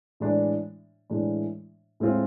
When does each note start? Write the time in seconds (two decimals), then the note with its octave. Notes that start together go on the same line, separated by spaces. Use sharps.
0.20 A2 E3 G#3 D4
1.10 A2 E3 G#3 D4
2.00 A2 G#3 C4 F4